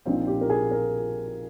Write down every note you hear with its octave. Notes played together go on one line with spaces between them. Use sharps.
A#1 A#2 F3 C4 D#4 F4
G4
A#4
G#4
A#4